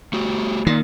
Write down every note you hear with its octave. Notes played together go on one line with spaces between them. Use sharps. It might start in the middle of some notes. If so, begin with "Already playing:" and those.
A3 F#4 G4
A#2 D#3